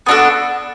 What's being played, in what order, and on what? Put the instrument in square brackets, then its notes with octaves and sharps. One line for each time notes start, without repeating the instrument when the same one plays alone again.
[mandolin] B3 D4 F#4 A4